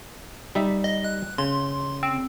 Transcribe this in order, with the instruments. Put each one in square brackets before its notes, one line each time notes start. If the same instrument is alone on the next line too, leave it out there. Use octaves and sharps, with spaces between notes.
[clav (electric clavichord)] G3 D#4 E5
[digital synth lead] D#5
F#6
[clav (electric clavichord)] C#3 [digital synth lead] C6
[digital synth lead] C4